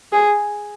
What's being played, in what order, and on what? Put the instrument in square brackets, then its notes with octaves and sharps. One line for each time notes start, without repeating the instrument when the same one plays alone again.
[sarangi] G#4